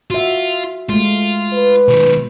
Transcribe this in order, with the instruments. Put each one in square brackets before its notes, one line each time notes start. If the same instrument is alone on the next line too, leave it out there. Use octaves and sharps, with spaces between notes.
[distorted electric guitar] F4 [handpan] F#4 E5
[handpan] G#3 A3 [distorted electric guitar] F4
[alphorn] B4
[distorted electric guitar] B1 D#3 [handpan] B2